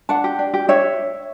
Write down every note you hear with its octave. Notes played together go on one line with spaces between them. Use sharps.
D4 F#5 A5
G4
D4
G4
D4 C#5 E5